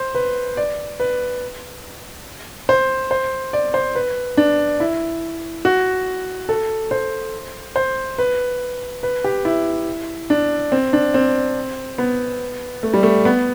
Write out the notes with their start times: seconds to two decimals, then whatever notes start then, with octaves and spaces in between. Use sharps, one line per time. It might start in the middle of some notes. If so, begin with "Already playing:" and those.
Already playing: C5
0.15 B4
0.57 D5
1.00 B4
2.69 C5
3.11 C5
3.53 D5
3.74 C5
3.95 B4
4.37 D4
4.80 E4
5.65 F#4
6.49 A4
6.91 C5
7.76 C5
8.18 B4
9.03 B4
9.24 G4
9.45 E4
10.30 D4
10.72 C4
10.93 D4
11.14 C4
11.98 B3
12.83 A3
12.94 G3
13.03 A3
13.25 B3